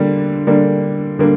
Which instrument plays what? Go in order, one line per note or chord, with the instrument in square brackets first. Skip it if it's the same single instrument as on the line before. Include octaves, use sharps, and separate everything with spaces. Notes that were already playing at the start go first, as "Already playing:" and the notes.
Already playing: [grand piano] D3 G3 A#3 D4
D3 G3 A#3 D4
D3 G3 A#3 D4